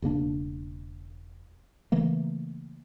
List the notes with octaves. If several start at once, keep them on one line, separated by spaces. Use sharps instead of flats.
E1 C#3 A#3 D4
C#3 E3 A3 A#3